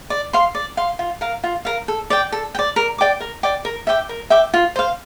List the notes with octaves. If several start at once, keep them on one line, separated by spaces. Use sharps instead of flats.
D5
F5 C6
D5
F5 C6
F4
A#4 F5
F4
A#4 F5
A4
D5 G5
A4
G5
D5
A#4
D5 G5 D6
A#4
D5 G5 D6
A#4
E5 G5 D6
A#4
E5 G5 D6
F4
C5 F5